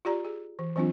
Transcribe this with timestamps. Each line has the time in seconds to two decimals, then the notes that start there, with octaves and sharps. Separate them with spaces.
0.05 F4 G4 D5 A#5
0.25 G#4
0.59 E3
0.76 E3 F#3 C4 D4 F4